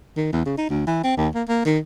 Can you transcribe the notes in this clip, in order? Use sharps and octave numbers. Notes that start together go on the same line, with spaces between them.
D#3
E2
C#3
D#4
D2
E3
C4
D#2
A#3
A#3
D#3